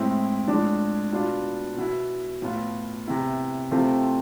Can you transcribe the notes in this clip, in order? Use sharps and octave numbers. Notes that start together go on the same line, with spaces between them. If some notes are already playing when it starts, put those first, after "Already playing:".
Already playing: A2 G#3 C4 E4
A2 F3 G#3 D4
B2 B3 D4 F4
B2 B3 E4
A2 F3 B3 F4
C3 E3 B3 E4
C3 E3 A3 C4 F4